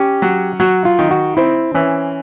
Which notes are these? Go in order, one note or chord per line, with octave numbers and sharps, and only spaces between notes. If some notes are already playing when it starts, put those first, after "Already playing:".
Already playing: C#4 G4
F#3
F#3 F#4
F4
D#3
F#4
C4 E4
E3 C#4